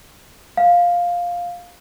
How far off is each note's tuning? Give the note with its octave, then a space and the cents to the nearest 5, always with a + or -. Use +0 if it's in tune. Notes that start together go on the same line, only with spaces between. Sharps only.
F5 +5